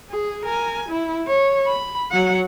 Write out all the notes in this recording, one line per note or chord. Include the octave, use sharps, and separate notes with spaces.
G#4
A#4 G#5
E4
C#5
B5
F#3 F#5